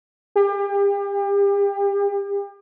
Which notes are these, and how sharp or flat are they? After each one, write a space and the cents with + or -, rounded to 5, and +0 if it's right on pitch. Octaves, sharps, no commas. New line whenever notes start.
G4 +35